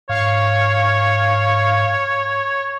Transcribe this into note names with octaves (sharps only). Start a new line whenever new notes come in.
G#2 C#5 F5 C#6